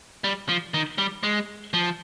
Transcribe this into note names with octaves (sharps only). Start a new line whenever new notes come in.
G3
F3
D#3
G3
G#3
F3